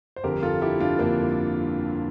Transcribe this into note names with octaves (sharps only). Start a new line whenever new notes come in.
C5
G1 F2 D3 G4 A#4
F4 A4
E4 G4
D4 F4
G1 F2 D3 A#3 D4